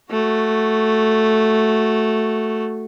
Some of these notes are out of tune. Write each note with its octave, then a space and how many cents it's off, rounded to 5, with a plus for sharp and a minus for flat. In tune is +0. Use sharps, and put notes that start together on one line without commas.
A3 +0 F#4 +0